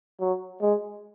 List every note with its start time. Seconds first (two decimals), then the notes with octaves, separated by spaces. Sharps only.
0.20 F#3
0.61 G#3